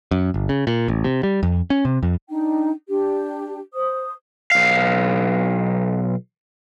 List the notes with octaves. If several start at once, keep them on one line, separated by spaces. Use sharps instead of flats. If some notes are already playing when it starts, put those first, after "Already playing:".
F#2
G1
C#3
A#2
A1
C3
G3
F2
C#4
C3
F2
D4 D#4 G5
D4 G4
C5 D#6
B1 F5